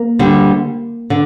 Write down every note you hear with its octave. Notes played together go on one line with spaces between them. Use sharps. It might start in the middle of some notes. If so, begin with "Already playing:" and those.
Already playing: A#3
D2 D3 G3
D3